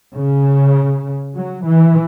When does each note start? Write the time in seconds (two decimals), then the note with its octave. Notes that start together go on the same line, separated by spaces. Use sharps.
0.16 C#3
1.36 F#3
1.65 E3